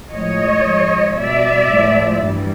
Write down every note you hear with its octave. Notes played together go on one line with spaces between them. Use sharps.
A2 F3 G#3 C#5 D#5
G#2 F3 G#3
B2 G3 D5 E5
A2 F3 G#3
G2 E3 G3